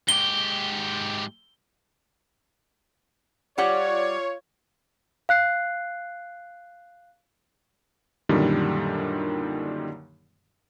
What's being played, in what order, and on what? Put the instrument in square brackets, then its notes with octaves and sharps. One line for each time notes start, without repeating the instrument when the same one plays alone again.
[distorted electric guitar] G#2 G4 [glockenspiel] G7
[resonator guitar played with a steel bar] G3 G4 F#5 [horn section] F4 C#5 [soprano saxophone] D5
[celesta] F5 F#6 C7
[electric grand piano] F#2 A#2 D3 D#3 G3